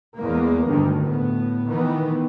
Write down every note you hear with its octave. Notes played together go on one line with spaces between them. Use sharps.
E2 G#3 A#3
D2 G2 D3 D#3
A2 B3
D#3 E3 B3